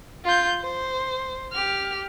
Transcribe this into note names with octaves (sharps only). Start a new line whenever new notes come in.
F4 G6
C5
G4 F6